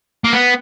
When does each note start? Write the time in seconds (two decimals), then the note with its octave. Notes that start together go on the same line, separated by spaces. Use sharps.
0.24 A#3
0.33 B3